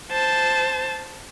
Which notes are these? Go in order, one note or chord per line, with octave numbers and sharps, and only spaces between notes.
C5 A5